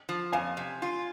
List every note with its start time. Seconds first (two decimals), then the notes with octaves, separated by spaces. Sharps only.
0.09 F3
0.32 F2 F5 G#5
0.57 C3
0.82 F4